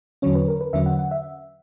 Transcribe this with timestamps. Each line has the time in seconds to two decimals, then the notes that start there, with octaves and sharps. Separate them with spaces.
0.22 E2 D3 F#3 C#4 C#5
0.35 B4
0.48 A#4
0.61 B4
0.73 E2 D3 F#3 C#4 E5
0.86 F#5
0.99 F#5
1.11 E5